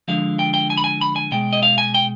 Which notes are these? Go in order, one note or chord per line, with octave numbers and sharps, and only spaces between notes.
D3 F3 G#3 F5
G5
G5
G#5
B5
G#5
B5
G#5
B2 G#3 G5
D#5
F5
G#5
G5